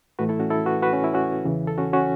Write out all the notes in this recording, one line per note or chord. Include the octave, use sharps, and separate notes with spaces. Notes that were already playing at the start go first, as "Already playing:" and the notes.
A2 E3 A3 F#4 B4
E4 A4
C#4 F#4
E4 A4
F#4 B4
F#4 B4
C#4
E4
C#4 F#4
E2 C#3 E3
A4
C#4 F#4
C#4 F#4